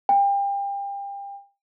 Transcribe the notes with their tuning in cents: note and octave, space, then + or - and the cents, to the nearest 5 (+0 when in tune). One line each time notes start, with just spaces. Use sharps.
G5 +30